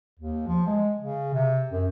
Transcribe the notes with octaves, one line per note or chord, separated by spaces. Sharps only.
D#2
F3
G#3
C#3
C3
F#2